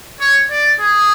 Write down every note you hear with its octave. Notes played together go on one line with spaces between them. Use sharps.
C#5
D5
G#4